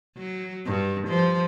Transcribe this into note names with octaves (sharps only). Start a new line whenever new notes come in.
F#3
G2
F3